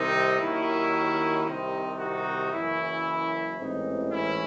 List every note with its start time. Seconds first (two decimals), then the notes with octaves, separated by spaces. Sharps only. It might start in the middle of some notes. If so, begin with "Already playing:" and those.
Already playing: C2 C3 D#3 C4 D#4
0.39 D#2 D#3 F#3 C#4 E4
1.46 C2 C3 D#3 C4 D#4
1.99 D#4 F#4
2.52 F#1 F#2 E3 C#4 E4
3.59 A1 G#2 E3 C4 D#4
4.12 C#4 E4